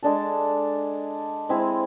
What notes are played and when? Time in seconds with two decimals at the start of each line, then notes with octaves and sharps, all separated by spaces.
0.03 G#3 D4 A4
1.49 G#3 C4 E4 G#4